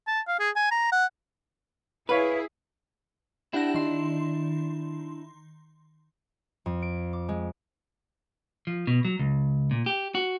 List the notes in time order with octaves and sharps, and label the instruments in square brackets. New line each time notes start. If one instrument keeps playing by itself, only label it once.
[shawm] A5
F5
G#4
G#5
A#5
F#5
[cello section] E4 G#4 [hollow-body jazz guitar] B4 [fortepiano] C#5 F5 B5
[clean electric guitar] D4 E4 [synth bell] G4 F#5 A#6
[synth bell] D#3 C6
[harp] F2
D7
D6
G#3
[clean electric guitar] F3
B2
F#3
C#2
A#2
G4
F#4